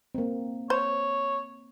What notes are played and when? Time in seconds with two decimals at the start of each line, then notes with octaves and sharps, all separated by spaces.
0.15 A#3 C4
0.70 C5 C#5